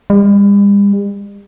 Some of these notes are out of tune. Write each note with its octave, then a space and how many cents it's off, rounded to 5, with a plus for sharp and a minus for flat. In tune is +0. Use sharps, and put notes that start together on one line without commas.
G3 +45